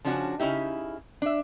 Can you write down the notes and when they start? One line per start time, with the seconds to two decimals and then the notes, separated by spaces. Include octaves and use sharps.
0.05 C#3 F3 C#4 D4 F#4
0.40 C#3 C#4 D#4 E4 G4
1.22 D4 E5